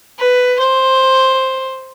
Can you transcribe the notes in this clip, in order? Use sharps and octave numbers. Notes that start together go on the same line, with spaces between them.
B4
C5